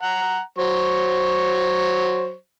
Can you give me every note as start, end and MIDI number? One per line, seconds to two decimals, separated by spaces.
0.02 0.41 78
0.02 0.41 82
0.58 2.34 54
0.58 2.34 72
0.58 2.34 85